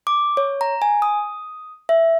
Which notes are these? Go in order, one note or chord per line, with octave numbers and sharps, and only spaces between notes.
D6
C#5
A#5
G#5
D#6
E5